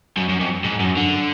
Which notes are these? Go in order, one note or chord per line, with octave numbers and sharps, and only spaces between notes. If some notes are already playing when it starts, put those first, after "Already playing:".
F#2
F#2
F2
G#2
F#2
D3